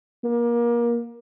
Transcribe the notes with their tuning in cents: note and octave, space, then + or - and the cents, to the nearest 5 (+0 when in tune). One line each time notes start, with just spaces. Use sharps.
A#3 +25